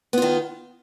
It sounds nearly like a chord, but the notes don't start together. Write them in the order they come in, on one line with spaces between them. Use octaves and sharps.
B3 F4 D#3